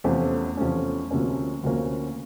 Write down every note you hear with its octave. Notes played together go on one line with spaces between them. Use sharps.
E2 C3 F3 A3 C#4
E2 C3 F3 A3 C#4
D2 C3 F3 A#3 C#4
D2 C3 F3 A#3 C#4